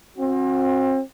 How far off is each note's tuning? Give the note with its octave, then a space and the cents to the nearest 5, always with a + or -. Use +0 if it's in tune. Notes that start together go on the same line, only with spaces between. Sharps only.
C4 +35 F#4 -30